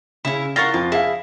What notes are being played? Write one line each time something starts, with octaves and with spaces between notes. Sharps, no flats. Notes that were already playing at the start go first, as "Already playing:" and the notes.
C#3 E4 C#5
F4 A#4 F#5 C#6 A6 A#6
F2 F4
E4 G#4 F5